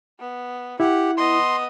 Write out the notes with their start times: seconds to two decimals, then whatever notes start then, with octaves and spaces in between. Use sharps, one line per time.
0.20 B3
0.80 E4 G4 F#5
1.18 B3 D#5 C6